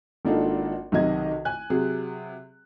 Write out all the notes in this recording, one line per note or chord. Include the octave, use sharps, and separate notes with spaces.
G#1 A#3 D4 D#4 F4 A4
B1 C3 D#3 D#5 G#6
G#5 F#6
C3 F#3 G#4